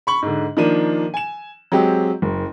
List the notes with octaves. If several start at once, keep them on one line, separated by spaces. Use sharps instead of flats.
B5 C#6 F#7
G#2 D3
D#3 F3 A#3 D4 D#7
G#5 E7
F#3 G#3 C4 G4
F#1